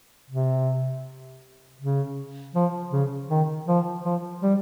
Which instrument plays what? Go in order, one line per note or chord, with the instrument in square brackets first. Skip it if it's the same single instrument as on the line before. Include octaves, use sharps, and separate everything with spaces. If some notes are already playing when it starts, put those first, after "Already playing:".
[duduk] C3
C#3
F3
C#3
D#3
F3
F3
G3